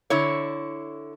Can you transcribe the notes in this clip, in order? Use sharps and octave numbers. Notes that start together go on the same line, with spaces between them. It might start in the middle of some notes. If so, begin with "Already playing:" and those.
D3 E4 C#5